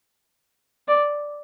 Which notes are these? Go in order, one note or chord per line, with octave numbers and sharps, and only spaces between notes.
D5